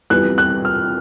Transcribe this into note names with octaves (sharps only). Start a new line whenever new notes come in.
F2 C3 E3 G3 B3 F#6
F#6
F6